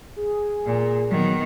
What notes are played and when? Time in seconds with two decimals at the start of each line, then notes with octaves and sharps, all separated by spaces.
0.16 G#4
0.67 A#2
1.11 D#3 F#3 B3